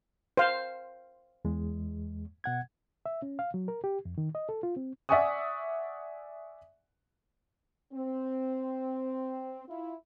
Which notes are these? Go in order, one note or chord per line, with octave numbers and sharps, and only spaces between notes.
C5 F5
E2 G#3
B2 F#5 G#6
E5
C#4
F5
F#3
A#4
G4
F2
D#3
D#5
A4
F4
C4
D5 E5 F#5 G#5 C#6 D#6
C4
E4 F4